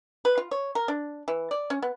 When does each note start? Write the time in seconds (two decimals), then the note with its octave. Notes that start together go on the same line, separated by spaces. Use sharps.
0.25 B4
0.38 F4
0.51 C#5
0.75 A#4
0.88 D4
1.28 E3
1.51 D5
1.70 C#4
1.82 B3